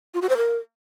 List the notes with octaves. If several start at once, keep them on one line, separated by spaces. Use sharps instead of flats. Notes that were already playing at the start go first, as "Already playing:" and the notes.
F4
F#4
C5
A#4